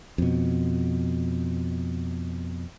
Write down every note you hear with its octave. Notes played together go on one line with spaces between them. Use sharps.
F2 B2